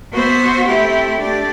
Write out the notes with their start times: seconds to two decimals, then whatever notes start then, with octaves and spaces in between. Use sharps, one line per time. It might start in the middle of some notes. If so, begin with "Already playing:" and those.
0.12 B3 F#4 C5 E5
0.66 A3 C4 E4 G4
1.19 A3 D4 G4 D5